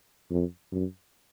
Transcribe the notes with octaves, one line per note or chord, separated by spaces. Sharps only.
F2
F#2